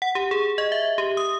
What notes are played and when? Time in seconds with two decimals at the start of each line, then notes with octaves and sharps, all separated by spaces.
0.02 F#5
0.15 G4
0.31 G#4
0.58 D#5
0.72 E5
0.98 G4
1.17 D#6